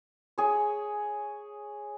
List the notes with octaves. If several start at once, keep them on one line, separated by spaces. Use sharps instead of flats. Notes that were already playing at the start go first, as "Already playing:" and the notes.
G#4 C#5